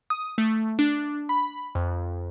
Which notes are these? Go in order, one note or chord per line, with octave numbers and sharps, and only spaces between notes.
D#6
A3
D4
B5
F2